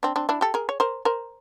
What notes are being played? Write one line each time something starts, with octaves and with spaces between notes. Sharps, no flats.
C4 D4
C4 D4
D4 E4
G4 A4
G#4 A#4
C#5
A#4 C5
A#4 C5